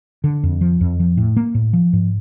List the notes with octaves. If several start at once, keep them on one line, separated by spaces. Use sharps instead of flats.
D3
F2
F3
F2
F3
A2
A#3
A2
F3
G#2